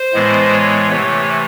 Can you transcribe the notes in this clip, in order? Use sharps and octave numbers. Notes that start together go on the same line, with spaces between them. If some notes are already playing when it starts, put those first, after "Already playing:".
Already playing: C5
A2 E3 G#3 B3
C#5
C3 E3 A3 C#5